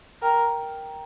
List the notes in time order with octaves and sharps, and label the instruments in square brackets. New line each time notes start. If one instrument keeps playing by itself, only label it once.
[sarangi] A#4 [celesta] G5